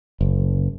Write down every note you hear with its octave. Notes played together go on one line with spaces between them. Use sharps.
F#1